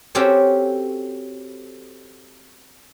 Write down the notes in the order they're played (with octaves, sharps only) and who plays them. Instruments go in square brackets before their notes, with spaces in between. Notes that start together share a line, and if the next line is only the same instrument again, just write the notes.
[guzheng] C4 C#4 F#4 G4 A4 C5